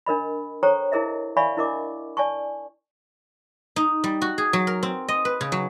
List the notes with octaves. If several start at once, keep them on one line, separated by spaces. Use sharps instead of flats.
D4 A#4 D#5 B5
A4 C5 C#5 G5 A#5 C#6
E4 G#4 A#4 D#5 E5
D5 E5 F5 G#5 B5 C#6
D4 E4 A#4 D#5 D6
D5 G#5 A5 C#6
D#4
G3
F#4
G#4
F#3
A#4
C4
D#5
B4
C#3
F#3